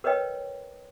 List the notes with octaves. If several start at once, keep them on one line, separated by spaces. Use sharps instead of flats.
A#4 B4 C#5 D#5 G5